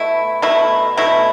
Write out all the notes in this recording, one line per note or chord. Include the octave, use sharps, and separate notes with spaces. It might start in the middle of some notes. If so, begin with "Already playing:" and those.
Already playing: B2 A3 E4
B2 A3 E4
B2 A3 E4